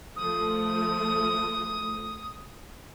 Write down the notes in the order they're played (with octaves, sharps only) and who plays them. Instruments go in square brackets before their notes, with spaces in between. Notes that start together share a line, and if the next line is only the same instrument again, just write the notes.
[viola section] F3 A3 [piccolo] D#6